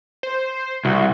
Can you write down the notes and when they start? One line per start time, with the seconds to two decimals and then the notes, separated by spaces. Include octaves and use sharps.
0.23 C5
0.85 C2 F#4